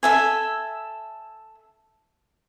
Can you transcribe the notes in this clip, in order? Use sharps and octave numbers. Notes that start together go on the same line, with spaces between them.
A4 E5 G#5